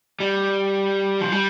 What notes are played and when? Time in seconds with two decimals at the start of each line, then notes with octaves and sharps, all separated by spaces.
0.20 G3
1.21 F3
1.32 G3